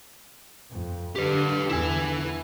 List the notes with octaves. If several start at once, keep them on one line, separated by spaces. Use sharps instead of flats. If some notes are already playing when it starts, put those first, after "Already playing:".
F2
D3 G4 B4
E2 D3 E4 G#5